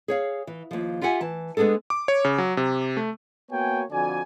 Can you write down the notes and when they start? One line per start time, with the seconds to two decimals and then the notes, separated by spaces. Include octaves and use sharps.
0.08 G#4 C#5 F5
0.47 E3
0.71 D#2 F3
1.02 F4 G4 E5 F#5 G#5
1.21 E3 A5
1.57 G#3 B3 D4 G#4 A4
1.90 D6
2.08 C#5
2.25 C#3
2.38 F#3
2.57 C3
2.97 A3
3.50 A#3 B3 F#4 C#5 G5 G#5
3.90 F2 D3 F#4 D5 G#5